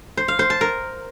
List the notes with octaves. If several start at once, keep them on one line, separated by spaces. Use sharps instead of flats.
C5
F5
C5
A5
A#4